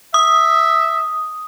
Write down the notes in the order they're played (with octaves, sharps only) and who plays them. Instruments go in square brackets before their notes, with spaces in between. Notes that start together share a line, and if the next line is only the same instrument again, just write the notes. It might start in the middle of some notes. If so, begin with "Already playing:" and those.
[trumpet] E5 [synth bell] D#6